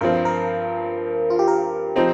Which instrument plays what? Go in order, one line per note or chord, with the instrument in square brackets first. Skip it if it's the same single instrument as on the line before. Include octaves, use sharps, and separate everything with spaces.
[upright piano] G2 F3 C4 [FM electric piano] A#4
[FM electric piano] A#4
F4
G4
A#4
[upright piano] F3 C4 D#4